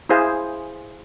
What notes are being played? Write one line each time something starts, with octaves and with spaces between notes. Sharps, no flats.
E4 G#4 C5 F5 G#5